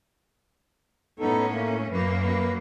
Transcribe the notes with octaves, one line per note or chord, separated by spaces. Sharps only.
A2 B3 C#4 D#4 A4
A3 A#3
F#2 A#3 B4
B4